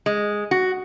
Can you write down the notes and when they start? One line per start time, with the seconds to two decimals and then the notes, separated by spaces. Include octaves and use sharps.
0.06 G#3
0.51 F#4